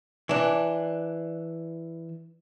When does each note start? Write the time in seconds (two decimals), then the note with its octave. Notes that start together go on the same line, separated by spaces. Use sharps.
0.29 E3 D4